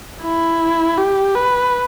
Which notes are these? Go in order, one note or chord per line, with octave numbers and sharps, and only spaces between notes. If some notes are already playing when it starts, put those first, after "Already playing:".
E4
G4
B4